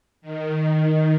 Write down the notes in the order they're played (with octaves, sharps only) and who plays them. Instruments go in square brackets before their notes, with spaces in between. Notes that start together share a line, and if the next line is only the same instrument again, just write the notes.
[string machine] D#3